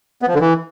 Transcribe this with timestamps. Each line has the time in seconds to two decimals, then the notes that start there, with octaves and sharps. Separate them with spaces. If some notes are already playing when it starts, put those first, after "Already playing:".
0.22 B3
0.28 F3
0.35 D3
0.41 E3